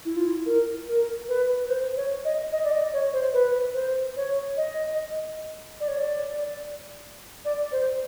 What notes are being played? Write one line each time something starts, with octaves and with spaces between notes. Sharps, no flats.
E4
F4
E4
A#4
A#4
B4
B4
C5
C#5
D#5
D#5
D5
D#5
C#5
C5
B4
C5
C#5
D#5
D5
C#5
D5
D5
C5